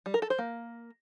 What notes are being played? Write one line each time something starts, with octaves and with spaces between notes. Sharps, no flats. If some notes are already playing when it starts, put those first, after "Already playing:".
G3
A#4
A4
C5
A#3